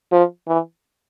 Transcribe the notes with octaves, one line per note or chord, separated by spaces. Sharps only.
F3
E3